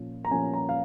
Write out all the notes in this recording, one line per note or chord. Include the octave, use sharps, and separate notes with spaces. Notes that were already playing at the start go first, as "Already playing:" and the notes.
Already playing: A#2 F3 C#4
A#5
A#2 F3 C#4 G#5
A#5
F5